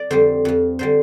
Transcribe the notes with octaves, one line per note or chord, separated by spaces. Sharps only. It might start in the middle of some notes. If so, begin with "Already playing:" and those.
Already playing: D5
F2 D3 G3 C5
F2 F3
D3 G3 C5